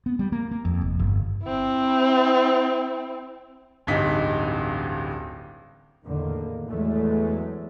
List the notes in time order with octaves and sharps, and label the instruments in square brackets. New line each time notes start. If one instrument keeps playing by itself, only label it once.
[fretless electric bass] B3
G3
A#3
A#3
F2
F1
G1
[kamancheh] C4 E4
[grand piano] D1 A1 G2 D#4 B6
[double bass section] E2 A2 D3 D#3 A#3
E2 E3 F#3 G#3 A3